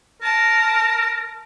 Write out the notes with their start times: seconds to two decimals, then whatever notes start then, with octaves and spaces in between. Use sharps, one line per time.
0.22 A#4 A5